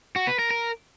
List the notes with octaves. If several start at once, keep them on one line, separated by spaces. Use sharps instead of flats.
F#4
B4
A#4
A#4